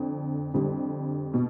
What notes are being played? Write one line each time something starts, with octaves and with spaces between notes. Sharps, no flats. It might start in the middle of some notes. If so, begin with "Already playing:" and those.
Already playing: F2 D3
F2 D3 G3
B2